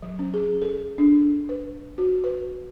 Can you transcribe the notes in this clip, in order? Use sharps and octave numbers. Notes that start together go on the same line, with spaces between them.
F#3
C#4
G#4
A4
D4
B4
F#4
B4